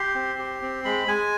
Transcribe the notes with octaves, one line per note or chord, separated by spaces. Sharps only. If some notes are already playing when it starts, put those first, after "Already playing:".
Already playing: G4 C6
C4
G4
C4
G#3 B5
G#3 G#5